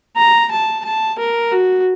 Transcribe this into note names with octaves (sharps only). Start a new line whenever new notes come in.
A#5
A5
A5
A#4
F#4